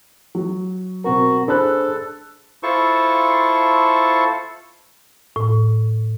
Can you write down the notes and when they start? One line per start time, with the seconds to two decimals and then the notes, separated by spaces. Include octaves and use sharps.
0.35 F#3
1.04 B2 C4 F#4 A#4
1.48 D4 G#4 A4 C5 B5 F#6
2.63 E4 F4 A4 C5 A5 C#6
5.36 A2